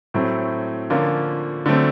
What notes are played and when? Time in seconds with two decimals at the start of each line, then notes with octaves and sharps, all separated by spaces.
0.14 A2 F#3 A3 C4
0.90 D3 F3 A#3 C#4 F4
1.66 D3 F#3 A3 C4